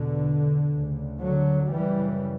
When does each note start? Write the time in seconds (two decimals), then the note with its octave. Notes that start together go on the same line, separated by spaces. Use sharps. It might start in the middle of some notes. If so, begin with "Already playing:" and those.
Already playing: E2 B2 D3
0.70 D2 C#3
1.21 D3 F#3
1.73 F#2 C#3 E3 G3